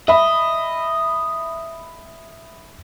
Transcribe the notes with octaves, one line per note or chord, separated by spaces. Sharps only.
D#5 E5 B5